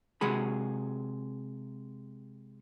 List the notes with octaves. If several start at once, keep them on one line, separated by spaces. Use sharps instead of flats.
C3 G#3 F#4 G#4 B5